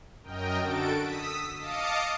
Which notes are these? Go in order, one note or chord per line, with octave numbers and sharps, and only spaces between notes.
F#2 A#4 D#5 G5
D3 F#4 A4 A5 D7
D#6 E6 B6
D#5 F5 A5 D6 D#6 C#7